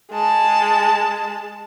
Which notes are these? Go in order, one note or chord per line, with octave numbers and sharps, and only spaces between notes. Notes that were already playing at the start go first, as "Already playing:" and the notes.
G#3 A5